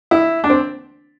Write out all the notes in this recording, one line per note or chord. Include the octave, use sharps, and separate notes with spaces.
E4
D4
C4